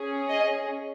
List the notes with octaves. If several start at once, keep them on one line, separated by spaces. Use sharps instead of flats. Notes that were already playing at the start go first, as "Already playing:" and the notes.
Already playing: C#4 G#4
D#5